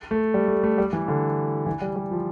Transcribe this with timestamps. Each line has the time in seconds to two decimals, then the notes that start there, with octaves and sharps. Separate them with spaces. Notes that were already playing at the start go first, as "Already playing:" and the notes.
0.11 A3
0.34 G3
0.48 A3
0.63 A3
0.78 G3
0.93 E3
1.08 D3
1.66 E3
1.81 G3
1.96 G3
2.11 F3